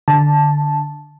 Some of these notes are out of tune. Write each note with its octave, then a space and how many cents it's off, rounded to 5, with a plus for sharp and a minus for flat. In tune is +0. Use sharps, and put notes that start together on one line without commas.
D3 +5 A5 -5